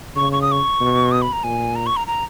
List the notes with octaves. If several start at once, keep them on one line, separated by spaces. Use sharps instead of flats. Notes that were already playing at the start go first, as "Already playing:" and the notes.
C#3 C#6
C#6
D#6
C#6
B2
D#6
B5
A#5
A#2 G#5
A#5
C#6
A#5
A#5